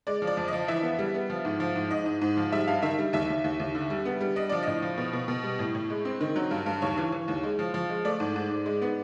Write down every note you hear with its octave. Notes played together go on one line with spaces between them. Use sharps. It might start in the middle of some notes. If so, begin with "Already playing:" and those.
G#3 D5
F3
D5
F2
F3 D#5
E3 E5
B3
G3
B3
F3
G#2
F3
G#2
G#2 D#5
G#2
G#2
F3
G3 E5
G2 F5
D#3 E5
G3
D#2 E5
D#2
D#2
D#2
D3
G3
B3
G3
D4 D#5
F3 D5
A2 D#5
F3
B2
B2
B2
G3
A2
A2
G#3
C4
D#3
F#3
G2
G2
D#2 C#5
E3
E3
D#2
G#3
F3
F3
G#3
A3 D5
G#2
G#2
G#2
G#3
B3